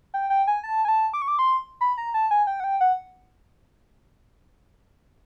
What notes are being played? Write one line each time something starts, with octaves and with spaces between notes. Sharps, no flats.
G5
G5
G#5
A5
G#5
A5
D6
C#6
D6
C6
B5
A#5
A5
G#5
G5
F#5
G5
F#5